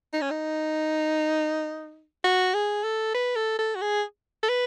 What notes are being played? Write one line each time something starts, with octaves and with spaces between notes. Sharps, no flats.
D#4
C#4
D#4
F#4
G#4
A4
B4
A4
A4
F#4
G#4
A4
B4